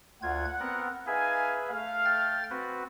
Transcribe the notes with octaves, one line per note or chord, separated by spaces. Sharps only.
D2 F4 F#5 G#6
B3 C4 A#4
D#4 G#4 B4 E5 F5 G#5
A3 F5
G5 F6 A6
C4 F#4 B4